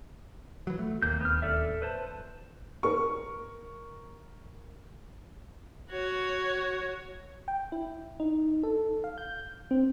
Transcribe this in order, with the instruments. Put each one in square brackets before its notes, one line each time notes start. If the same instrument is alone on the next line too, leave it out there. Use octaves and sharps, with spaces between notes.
[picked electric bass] E3 F#3
A3
[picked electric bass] D1 D#2 [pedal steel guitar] A#3 G6
[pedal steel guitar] B3 F6
A4 D5 E5
B4 C5 A5
[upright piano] A#4 C#6
[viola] F#4 C#5
[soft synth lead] G5
E4
D#4
A4
F5
G6
C4